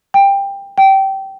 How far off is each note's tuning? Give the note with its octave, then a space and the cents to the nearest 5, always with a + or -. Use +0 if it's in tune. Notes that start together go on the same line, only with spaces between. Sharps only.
G5 +15
G5 -20